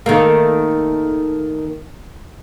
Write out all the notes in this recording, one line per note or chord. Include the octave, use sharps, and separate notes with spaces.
D#3 A3 A#3